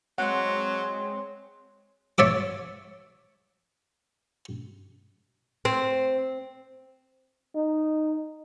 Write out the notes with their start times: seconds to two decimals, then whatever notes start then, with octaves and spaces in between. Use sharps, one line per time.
0.18 F#3 G#3 C4 C#5 F#5 C6
2.18 C#5 D5 E5 D6
5.65 C4
7.55 D#4